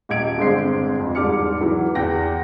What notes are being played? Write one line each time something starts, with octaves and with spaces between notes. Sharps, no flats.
D#1 D#5 G#6 D7
G1 G#3 C4 C7
F2
E2 G#2 G3 D6 F6 C#7
E3 F#3
E2 G5 A#6